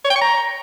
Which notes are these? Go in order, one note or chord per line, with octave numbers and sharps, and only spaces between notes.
C#5
G5
C#6
A#5